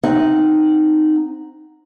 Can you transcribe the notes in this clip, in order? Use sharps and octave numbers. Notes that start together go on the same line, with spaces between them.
C4 D#4 F#5